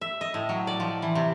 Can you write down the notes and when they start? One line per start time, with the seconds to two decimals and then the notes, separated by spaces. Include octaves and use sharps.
0.01 E5
0.21 D#5
0.34 A2
0.49 F#3
0.67 D5
0.80 F3
1.02 E3
1.15 C3